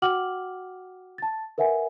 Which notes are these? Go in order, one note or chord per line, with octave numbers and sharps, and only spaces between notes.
F#4 F#5 G5 D6 F6 F#7
A5 A6
A#4 B4 E5 F#5 G#5